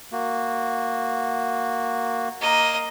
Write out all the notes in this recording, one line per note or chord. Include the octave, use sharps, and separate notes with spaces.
A#3 F#4
A#3 D#5